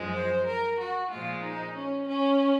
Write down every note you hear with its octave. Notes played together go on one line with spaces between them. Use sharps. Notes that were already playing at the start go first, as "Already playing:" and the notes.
Already playing: F#2 F3 G#3
C5
A#4
F#4
A#2 F3 G#3 F4
D#4
C#4
C#4